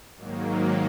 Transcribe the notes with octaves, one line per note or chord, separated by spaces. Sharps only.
G#2 D#3 F#3 A#3